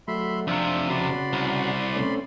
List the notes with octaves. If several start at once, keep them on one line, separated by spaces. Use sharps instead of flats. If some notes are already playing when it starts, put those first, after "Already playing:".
F#3 A3 E5 B5 C6
F2 C3 D4 F4 E5
C#3 F#4 D5 B5 C6
C2
A3 C4 C#4